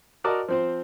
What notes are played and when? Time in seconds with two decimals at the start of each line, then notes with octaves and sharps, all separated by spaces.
0.24 F#4 A#4 D5 D#5 A5 A#5
0.48 F3 C4 C5